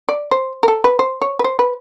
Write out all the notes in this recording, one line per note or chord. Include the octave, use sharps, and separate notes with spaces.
D5
C5
A#4
A4
B4
C5
C#5
B4
C5
B4